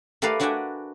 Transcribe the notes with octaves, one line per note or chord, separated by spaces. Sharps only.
A3 G4 A#4 B4 D5 F5
D4 F#4 D5 E5 G5 G#5